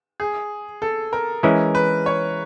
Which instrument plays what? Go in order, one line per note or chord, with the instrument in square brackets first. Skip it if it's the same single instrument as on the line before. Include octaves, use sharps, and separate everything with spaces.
[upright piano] G#4
A4
A#4
[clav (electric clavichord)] E3 G#3 C#4 E4 [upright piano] A#4
[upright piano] B4
C#5